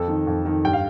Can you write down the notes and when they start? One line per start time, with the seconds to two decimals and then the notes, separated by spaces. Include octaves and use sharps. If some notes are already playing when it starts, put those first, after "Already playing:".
Already playing: F2 A4
0.08 D#3
0.27 F2
0.45 D#3
0.65 G2 G5
0.73 F5